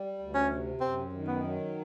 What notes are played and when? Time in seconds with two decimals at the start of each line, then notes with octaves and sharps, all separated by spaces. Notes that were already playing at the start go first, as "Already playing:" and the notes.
Already playing: G3
0.19 D2
0.34 C#4
0.50 C3
0.81 F#2 C4
1.13 D#3
1.27 B3
1.43 F#3